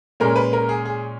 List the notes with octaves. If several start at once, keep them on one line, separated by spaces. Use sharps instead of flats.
A#2 G#3 C#4 A#4
B4
A#4
G#4
G#4